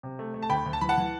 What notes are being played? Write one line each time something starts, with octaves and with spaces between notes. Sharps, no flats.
C3
A3
A3
A5
D2 G5 B5
D2
A5
E3 B5
F#5 A5
E3